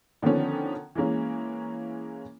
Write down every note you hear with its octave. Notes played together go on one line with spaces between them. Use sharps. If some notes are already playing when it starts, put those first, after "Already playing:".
D3 D#3 F3 B3 C#4
E3 G#3 A#3 C#4